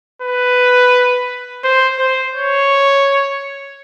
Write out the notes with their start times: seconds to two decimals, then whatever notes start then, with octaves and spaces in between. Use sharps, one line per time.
0.22 B4
1.64 C5
1.98 C5
2.34 C#5